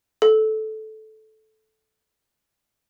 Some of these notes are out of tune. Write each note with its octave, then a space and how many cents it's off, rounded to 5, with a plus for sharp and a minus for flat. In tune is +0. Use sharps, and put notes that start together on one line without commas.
A4 -15